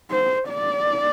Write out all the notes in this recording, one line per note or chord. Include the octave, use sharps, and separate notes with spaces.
C5
D5